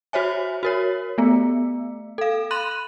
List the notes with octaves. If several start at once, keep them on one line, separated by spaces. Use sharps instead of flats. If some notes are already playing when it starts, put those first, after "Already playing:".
F#4 C5 C#5 E5 G#5
F#4 A#4 C#5
A3 B3
A4 F5
B5 C6 F#6 D#7 F#7